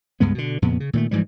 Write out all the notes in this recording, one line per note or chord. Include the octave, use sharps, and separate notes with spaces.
C#2 G2 G#3 B3
B2 D3
F2 A#2 C#3 B3
C#3
A#2 D#3 G3 A3
G#2 E3 F3 G3